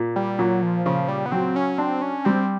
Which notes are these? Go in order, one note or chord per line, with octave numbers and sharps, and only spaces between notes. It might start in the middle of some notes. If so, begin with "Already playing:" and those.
Already playing: A#2
G3
A#2 F#3
F3
C#3 F3
G3
B3
F#3 C4
C#4
C4 D4
C#4
G3 C4